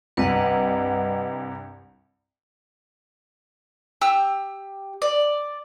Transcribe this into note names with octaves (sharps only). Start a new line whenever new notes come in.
C2 G2 B4 D#5 F#5
G4 E6
D5